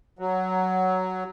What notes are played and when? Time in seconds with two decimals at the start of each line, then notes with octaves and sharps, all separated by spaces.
0.19 F#3